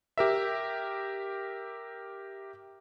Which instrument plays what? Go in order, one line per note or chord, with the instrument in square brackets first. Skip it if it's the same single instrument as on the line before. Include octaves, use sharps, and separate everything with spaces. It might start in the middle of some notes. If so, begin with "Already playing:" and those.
[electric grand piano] G4 A#4 E5